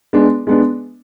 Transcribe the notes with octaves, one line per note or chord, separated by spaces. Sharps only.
G#3 B3 D4
G#3 B3 D4